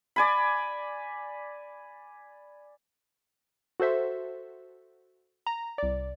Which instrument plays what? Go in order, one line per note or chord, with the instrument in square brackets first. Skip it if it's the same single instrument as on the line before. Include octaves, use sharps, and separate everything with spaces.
[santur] D5 G#5 B5
[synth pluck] F#4 A4 C5 E5
A#5
C2 D5